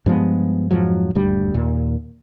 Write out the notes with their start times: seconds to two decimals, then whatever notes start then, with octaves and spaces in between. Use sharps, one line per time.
0.06 G2 F3 G#3 B3
0.71 F2 G#2 F3 F#3
1.15 D#1 D2 G2 G3
1.54 D#2 A#2